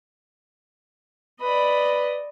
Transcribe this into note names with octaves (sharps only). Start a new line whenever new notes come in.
B4 D5 D#5 B5